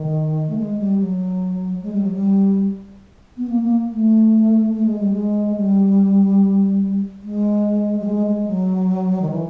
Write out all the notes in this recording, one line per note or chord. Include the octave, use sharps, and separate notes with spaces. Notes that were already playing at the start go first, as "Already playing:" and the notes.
Already playing: D#3
A3
G#3
G3
F#3
G#3
G3
F#3
G3
B3
A#3
A#3
A3
A3
G#3
G3
G#3
G3
G#3
G3
G#3
G#3
F#3
D#3
E3